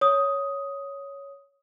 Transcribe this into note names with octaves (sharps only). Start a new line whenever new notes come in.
C#5 D#6